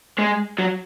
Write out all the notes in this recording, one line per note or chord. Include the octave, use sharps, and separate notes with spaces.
G#3
F#3